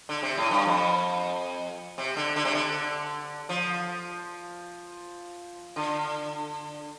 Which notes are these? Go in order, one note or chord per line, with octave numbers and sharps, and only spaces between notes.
D3
C3
A2
G2
F2
C3
D3
D3
C3
D3
F3
D3